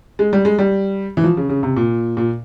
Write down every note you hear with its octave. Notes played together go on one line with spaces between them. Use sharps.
G#3
G3
G#3
G3
E3
F3
C#3
C#3
C3
A#2
A#2